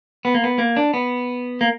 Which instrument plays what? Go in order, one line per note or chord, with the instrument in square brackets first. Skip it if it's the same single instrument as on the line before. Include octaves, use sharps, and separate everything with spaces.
[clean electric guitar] B3
A#3
B3
A#3
D4
B3
A#3